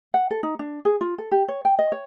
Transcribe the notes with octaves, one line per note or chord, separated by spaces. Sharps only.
F#5
A4
D#4
D4
G#4
F4
A4
G4
C#5
G5
D#5
C#5